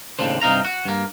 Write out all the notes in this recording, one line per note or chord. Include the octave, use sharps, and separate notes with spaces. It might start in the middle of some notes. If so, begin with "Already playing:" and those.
D#2 A2 C#3 D4 C5
G2 C3 D#4 F5 A#5
F#4
G2 A#3